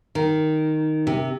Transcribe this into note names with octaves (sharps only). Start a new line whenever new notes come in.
D#3
C3